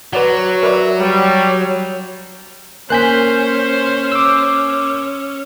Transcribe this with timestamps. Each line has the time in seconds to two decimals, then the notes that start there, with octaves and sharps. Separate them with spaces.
0.13 F#3 B4 C#5 D5 F#5
0.63 A#4 B4 D5 E5
0.99 G3 C#5
2.90 A#3 C#4 C5 G#5 F#6 G6 B6 F#7
4.12 D6 E6